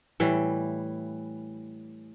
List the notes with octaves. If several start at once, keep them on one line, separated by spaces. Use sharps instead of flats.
A2 E3 G3